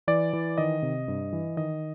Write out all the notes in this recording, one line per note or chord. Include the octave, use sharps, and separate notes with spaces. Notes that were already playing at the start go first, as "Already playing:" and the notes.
E3 D5
E3
D#3 D#5
C3
G2
E3
D#3 D#5